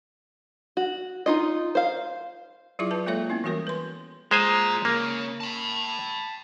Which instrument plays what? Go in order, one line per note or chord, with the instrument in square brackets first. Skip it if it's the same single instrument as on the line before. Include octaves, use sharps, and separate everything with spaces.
[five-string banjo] F#4
D#4 F4 D#5
C5 F5
[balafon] F#3 E4 F4 G#4 E5 D6
B4 A5
G#3 A#3 F4 A4 C#5 E5
B3 C#4 E4
E3 G3 F#4 A#4 C#5
B4 C6
[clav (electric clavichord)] G#3 C5 G#5 [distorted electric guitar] F4 A#5
[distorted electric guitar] C#3 [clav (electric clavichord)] A#3
[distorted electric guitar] A5 B5